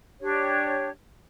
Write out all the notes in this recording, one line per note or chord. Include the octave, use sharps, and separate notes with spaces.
D4 G4 C#5